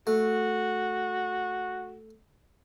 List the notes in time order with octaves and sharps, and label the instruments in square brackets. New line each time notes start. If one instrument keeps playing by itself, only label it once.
[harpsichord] A3 [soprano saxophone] F#4